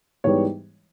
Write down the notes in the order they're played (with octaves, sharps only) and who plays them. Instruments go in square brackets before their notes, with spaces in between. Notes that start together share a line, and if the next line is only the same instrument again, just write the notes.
[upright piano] G#2 E3 G3 B3 C#5